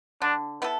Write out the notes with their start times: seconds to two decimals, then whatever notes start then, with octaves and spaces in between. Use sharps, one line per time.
0.22 D3 D4
0.62 B3 E4 A4